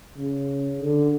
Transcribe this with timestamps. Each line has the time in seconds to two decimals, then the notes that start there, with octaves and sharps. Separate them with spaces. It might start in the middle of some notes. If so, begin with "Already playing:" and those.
0.18 C#3
0.80 D3